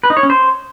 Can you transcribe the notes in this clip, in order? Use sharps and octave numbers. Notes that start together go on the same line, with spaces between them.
B4
D#4
C#5
C#4
C5